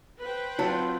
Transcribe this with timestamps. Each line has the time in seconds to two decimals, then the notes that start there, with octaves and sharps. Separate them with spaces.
0.22 B4 C5 G5
0.59 F#3 C4 F4 C#5 A5